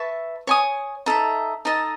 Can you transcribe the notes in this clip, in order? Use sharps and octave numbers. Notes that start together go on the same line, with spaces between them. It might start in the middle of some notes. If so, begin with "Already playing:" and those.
Already playing: B4 E5 A5 C#6
C#5 G#5 D#6
D#4 A4 E5
D#4 A4 D#5 A5